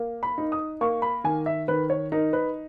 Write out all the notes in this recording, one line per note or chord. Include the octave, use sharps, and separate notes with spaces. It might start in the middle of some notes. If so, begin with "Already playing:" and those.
Already playing: A#3
B5
D#4
D#6
A#3 C#6
B5
D#3 G#5
E5
D#3 B4
C#5
D#4 A#4
B4